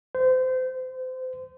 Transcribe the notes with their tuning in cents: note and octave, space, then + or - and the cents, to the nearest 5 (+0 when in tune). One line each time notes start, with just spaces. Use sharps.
C5 -30